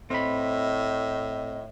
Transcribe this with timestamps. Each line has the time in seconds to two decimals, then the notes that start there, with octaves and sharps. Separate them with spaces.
0.10 A2 C4 D#5 B5